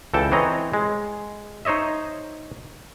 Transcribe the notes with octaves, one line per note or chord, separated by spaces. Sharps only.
C#2 E3 A4 G5 A5
E3 C4 B4 C#5 D#5 A#5
G#3
D#4 C5 C#5 D#5 E5